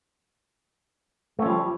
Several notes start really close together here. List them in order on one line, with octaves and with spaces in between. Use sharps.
A3 C#4 F3 G3